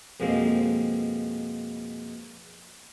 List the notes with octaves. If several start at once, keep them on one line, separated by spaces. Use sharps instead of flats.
F2 B2 G#3 A#3 C4